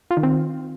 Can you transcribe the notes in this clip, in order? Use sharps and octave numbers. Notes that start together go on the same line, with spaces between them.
F4
D#3
C4